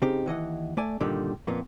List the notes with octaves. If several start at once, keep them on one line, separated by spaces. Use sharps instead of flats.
C#3 C4 D#4 G4
D#2 E3 D#5 F#5
A3 D5 G#5
G2 A#2 D3 D#3 G3
F2 A#2 A#3 B3